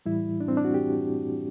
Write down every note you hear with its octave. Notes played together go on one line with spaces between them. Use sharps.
A2 E3 G3 E4
D4
C4
D4
F#4
G4